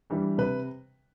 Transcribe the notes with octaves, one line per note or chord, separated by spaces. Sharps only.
E3 G3 D4
C3 B4